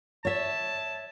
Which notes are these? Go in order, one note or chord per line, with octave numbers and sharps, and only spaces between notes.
C#5 E5 A5